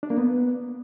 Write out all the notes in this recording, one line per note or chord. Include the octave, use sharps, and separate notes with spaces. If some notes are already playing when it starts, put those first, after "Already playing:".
D4
A#3
B3